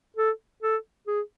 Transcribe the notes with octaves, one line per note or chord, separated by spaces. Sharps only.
A4
A4
G#4